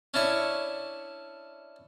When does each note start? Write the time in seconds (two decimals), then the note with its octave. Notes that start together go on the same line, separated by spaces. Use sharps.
0.14 C#4 D4 E4 C#6